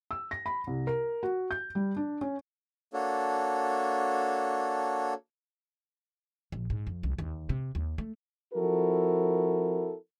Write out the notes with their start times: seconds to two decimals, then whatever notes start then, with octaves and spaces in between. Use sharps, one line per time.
0.11 E6
0.31 A#6
0.46 B5
0.67 C2
0.87 A#4
1.23 F#4
1.51 G6
1.75 G3
1.97 D4
2.21 C#4
2.93 A#3 D4 F#4 A4 C#5
6.52 A#1
6.70 G#2
6.87 F2
7.03 C2
7.18 D#2
7.49 C3
7.75 D#2
7.98 A3
8.54 F3 C4 E4 F#4 A4 A#4